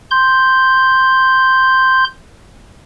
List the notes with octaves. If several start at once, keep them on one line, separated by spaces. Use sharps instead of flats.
C6 G6